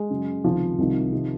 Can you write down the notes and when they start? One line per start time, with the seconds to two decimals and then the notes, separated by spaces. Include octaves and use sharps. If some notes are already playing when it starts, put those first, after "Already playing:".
Already playing: G#3
0.10 F#2 C#3
0.44 C#2 C3 D#3 F3
0.78 C2 C3 D#3
1.13 C3 D#3